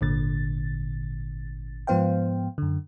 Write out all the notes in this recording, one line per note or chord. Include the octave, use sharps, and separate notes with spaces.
G#1 A#2 D3 A6
G#2 F3 B3 C5 F5 G5
F#2 D3